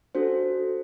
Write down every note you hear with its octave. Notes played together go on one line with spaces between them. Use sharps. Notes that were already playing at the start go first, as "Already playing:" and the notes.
D4 F#4 A4 C5